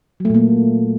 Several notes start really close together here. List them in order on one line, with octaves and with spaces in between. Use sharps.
F#3 A3 A#2 A#3